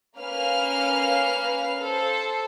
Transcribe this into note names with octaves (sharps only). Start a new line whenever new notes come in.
A#3 C#4 B4 F5 F6
A4 C5